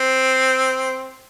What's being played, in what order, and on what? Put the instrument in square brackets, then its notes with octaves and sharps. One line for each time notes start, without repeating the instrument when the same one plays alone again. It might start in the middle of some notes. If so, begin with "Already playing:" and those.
Already playing: [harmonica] C4